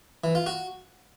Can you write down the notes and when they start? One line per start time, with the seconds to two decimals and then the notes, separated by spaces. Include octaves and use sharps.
0.24 E3
0.35 F4
0.46 F#4